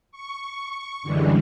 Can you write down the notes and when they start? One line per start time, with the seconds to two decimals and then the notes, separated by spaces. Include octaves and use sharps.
0.12 C#6
1.03 F#2 D3 E3 G3 G#3